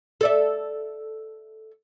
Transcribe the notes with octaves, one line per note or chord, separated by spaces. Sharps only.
A4 D5 E5